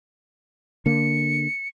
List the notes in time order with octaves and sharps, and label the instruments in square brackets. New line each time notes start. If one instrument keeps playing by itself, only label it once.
[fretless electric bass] D3 A#3 [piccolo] C#7